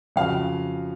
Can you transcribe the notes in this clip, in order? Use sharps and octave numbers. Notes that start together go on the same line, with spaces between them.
F2 C#3 F#3 F5